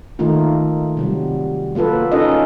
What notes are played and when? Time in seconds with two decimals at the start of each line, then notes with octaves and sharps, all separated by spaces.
0.19 D#3 A3 A#3 D#4 F4
0.97 C3 F#3 G3
1.75 F#3 A#3 F4 A4 B4
2.12 C#4 D#4 F4 A4 A#4 D#5